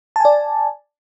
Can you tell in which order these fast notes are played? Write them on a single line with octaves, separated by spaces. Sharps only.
A5 G#5 D5